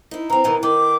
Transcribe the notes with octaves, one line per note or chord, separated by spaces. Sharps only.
D#4 E4
E3 C4 A#5
B2 D#3 E3
D#3 D6